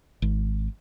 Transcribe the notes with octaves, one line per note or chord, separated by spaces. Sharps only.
G#1